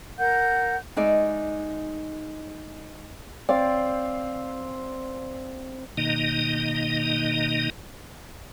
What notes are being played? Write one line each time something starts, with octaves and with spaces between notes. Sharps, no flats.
A#4 F#5 G6
G#3 D#4 D5 E5
C4 D5 F5
B2 D#3 A#3 D#4 D#5